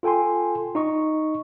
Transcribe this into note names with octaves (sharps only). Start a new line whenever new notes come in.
F4 A4 G5 G#5 C6
D#4 D#5 C#6